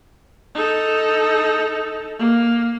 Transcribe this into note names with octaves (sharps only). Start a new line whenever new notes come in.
D#4 A4
A#3